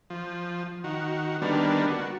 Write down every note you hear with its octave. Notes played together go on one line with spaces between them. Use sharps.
F3
D#3 F#4
D3 D#3 G3 A#3 B3 D4
F#4